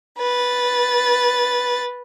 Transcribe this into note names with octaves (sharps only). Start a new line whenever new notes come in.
B4 A6